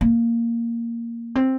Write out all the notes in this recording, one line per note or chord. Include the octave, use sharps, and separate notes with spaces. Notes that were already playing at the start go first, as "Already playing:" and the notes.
A#3
C4